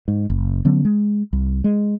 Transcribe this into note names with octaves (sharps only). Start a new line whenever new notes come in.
G#2
F#1
D3 F#3 B3 C#4
G#3
C2
G#3